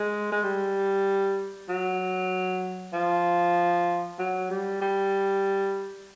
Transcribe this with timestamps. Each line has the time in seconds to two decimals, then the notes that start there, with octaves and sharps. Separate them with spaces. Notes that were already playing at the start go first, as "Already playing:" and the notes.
Already playing: G#3
0.32 G#3
0.44 G3
1.69 F#3
2.93 F3
4.19 F#3
4.50 G3
4.81 G3